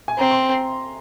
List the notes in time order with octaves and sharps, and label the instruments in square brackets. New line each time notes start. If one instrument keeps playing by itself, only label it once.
[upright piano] G#5
[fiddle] C4 [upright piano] A#5
[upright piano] C6